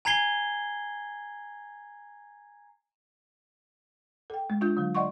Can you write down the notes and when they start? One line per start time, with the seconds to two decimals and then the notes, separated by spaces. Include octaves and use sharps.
0.05 G#5 A#5 G#6 C7 G7
4.30 A4 G5
4.50 G#3
4.61 D4 F4 E5 G6
4.77 D3 F#3
4.95 D5 D#5 F#5 C6 C#6